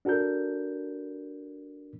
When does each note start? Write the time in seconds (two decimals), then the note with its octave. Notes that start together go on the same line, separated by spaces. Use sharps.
0.05 D4 F#4 A4 A#4 G6